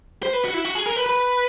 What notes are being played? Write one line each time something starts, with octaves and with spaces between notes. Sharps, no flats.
C5
B4
F#4
E4
F#4
G#4
A#4
B4
B4